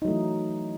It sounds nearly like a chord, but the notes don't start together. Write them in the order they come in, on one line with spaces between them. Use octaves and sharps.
D#4 F#3 A3 E3